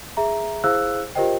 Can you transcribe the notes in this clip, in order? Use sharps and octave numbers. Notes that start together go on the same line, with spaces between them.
G#4 E5 A#5
E4 G#4 C5 F5 E6 F#6
F4 G4 A#4 C5 D#5 G5